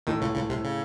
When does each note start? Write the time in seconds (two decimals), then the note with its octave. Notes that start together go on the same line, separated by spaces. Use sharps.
0.07 D#2 A2 D#3 A3
0.21 C#2 C#3
0.35 C#2 C#3
0.49 C2 C3
0.64 C#3